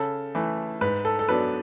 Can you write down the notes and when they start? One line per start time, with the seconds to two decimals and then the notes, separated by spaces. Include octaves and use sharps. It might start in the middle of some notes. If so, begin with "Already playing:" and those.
Already playing: C#3 A4
0.35 E3 A3
0.81 G#2 B4
1.05 A4
1.19 A4
1.28 F#3 B3 D4 B4